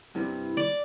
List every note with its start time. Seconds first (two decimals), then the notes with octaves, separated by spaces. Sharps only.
0.15 G2 C3 E4
0.57 D5